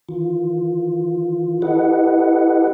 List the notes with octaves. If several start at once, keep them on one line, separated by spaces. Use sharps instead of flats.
D#3 E3 F4
E4 G4 A4 B4 D#5 F#5